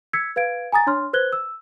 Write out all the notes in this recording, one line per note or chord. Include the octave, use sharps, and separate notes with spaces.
E6 G#6 B6 C#7
B4 F5 G#6 D7
G#5 A#5 D#6 A6
D4 C#5 C6 F6
B4 C5 F#6 G#6 G7
E6